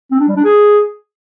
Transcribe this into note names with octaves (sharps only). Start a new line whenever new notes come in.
C4
D4
G3
D4
G#4